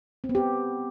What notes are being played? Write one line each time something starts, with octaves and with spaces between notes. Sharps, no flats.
C4
B3
G4